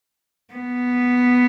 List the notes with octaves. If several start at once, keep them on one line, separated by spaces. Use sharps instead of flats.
B3